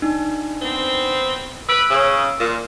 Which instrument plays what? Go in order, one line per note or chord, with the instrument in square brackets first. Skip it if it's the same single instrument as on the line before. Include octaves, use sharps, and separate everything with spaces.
[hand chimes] D4 D#4
[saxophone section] B3 C4
[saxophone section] B4 [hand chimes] E6 D7
[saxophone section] C#3
A#2